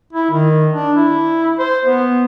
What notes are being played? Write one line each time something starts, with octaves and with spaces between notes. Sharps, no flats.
E4
D#3
D4
E4
C5
B3